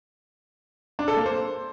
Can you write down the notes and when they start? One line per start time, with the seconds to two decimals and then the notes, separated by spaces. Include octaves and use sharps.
0.99 D4
1.08 A4
1.17 A#3
1.26 C5